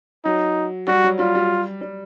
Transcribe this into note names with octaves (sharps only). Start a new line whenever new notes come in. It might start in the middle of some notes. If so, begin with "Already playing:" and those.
F#3 D#4
G3 F#4
F#3
G3 F4
G3
G3